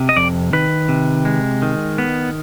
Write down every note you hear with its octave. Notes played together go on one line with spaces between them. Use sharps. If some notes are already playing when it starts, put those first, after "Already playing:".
Already playing: C3
D#5
F2 D5
D#3 B4
C3
G#3
D#3
B3